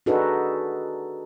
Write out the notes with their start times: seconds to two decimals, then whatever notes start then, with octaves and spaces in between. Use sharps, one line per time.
0.06 D4 D#4 F#4 G#4 A4 B4